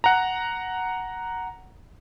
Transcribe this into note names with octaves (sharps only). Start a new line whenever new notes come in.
F#5 A#5